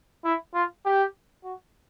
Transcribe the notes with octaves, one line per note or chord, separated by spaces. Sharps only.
E4
F4
G4
F#4